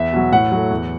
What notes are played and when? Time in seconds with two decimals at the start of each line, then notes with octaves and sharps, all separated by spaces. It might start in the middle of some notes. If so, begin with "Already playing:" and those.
Already playing: E2 E5
0.13 B2 F#3
0.32 A2 F#5
0.52 F#3 A3
0.71 E2